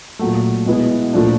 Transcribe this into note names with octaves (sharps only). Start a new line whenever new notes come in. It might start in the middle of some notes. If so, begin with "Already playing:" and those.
A#2 F#3 A3
B2 G#3 B3 E4
A#2 F3 A3 D4